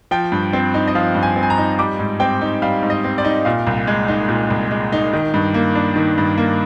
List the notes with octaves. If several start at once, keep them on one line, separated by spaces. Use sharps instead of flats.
F3 G5
G2
C4
D#4
D#5
F3 F5
G2
G#5
C4
G#5
A#5
D#4
G3 D6
G#2
C4 G5
D#4
G3 F5
G#2
D#5
C4
D5
D#4
A#2 F5
C2
G#3
D#4
A#2
C2
G#3
D#4
D#3
G2
A#3
D4
D#3
G2
A#3